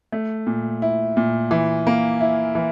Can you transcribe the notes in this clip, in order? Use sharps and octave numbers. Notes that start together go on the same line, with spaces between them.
A3
A#2
E4
A#2
E3
A#3
E4
E3